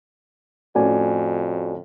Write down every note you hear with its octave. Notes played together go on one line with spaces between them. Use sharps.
F2 A2 C#4 F#4 D5 G#5